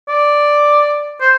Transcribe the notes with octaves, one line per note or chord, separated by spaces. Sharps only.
D5
C5